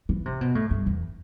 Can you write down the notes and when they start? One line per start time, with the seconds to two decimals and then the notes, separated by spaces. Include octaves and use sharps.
0.09 E3
0.26 C3
0.41 B2
0.55 A2
0.71 G2
0.86 E2